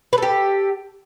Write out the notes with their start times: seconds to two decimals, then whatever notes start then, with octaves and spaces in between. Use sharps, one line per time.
0.13 B4
0.18 A4
0.22 G4